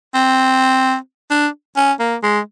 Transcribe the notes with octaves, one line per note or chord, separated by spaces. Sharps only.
C4
D4
C#4
A#3
G#3